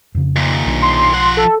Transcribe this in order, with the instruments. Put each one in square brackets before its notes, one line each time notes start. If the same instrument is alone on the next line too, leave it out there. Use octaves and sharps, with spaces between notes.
[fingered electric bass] F2 C#3
[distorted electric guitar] D#2 A#2
[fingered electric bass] B1 G3 D4
[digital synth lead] C6
[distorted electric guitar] F3 F#5
[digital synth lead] A4